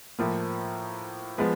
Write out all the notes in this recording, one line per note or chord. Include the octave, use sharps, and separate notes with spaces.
A2 F3 A#3
F3 G#3 B3